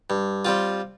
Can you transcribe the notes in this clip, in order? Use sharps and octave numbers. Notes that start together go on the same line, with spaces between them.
G2
G3 C4 F4